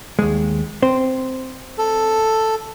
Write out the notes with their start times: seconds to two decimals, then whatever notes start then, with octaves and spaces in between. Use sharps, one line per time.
0.19 D#2 G#3
0.82 C4 C5
1.78 A4